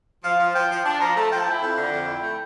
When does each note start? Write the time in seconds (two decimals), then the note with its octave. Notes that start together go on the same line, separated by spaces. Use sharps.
0.24 F3 F5
0.40 F3
0.55 F3 G5
0.71 F3
0.85 D4 A5
1.00 F3 A#5
1.16 A3 A5
1.32 F3 G5
1.40 A5
1.47 E4 G5
1.62 F2
1.78 D3
1.93 F2
2.08 E4
2.23 A3